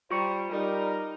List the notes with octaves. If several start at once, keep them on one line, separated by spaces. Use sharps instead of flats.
G3 F4 C5 C#6 C#7
G3 D#4 A#4